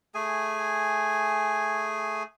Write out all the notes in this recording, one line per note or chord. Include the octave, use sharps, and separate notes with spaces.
A3 G#4 G#5